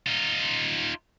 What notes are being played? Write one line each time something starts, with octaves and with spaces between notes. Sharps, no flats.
D#4 F4